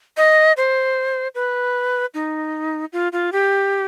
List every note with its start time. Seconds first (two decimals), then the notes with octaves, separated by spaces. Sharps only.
0.17 D#5
0.57 C5
1.35 B4
2.14 D#4
2.93 F4
3.13 F4
3.32 G4